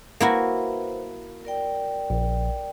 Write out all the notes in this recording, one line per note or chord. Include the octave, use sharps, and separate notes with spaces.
A#3 E4 F#4 B4 C5
A#4 D5 G5
A#1